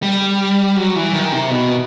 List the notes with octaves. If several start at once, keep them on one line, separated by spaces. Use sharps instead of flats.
G3
F#3
E3
D#3
C3
B2